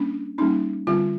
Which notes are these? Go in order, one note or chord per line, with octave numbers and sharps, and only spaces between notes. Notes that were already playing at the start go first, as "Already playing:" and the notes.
Already playing: G3 A#3 C#4 D4
G3 A#3 C#4 D#4
D3 G3 C4 F4